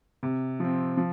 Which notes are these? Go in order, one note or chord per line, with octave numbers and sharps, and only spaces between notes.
C3
F3 C4
F3